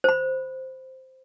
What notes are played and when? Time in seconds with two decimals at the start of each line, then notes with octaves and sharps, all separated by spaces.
0.04 C5 B5